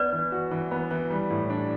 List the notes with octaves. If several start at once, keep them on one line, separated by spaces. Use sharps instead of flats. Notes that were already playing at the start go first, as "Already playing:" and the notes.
Already playing: B3 B4 D5
E3
F#4
E3
B3
E3
G3
A2
D4